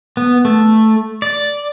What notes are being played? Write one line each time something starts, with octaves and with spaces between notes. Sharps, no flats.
B3
A3
D5